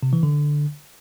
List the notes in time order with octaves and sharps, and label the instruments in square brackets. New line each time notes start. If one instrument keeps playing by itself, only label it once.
[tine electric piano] C3
E3
D3